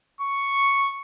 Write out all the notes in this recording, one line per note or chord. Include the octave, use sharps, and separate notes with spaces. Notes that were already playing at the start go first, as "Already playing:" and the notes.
C#6